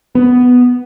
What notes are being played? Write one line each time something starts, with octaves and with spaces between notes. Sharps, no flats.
B3